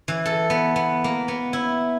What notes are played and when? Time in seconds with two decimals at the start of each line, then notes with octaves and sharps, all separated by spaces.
0.08 E3
0.25 A4
0.50 B3
0.76 B3
1.04 A#3
1.28 B3
1.53 E4